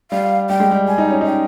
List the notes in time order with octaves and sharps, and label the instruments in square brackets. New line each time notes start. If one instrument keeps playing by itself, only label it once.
[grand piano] G3 [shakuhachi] F5
[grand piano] G3 [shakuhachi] G5
[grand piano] G#3
G3
[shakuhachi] G#5
[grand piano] D#4
C#4
D#4
[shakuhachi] G5